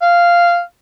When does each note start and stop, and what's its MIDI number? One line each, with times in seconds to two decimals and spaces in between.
0.02 0.60 77